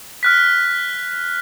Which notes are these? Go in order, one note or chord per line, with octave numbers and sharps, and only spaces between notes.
F6 F#6 B6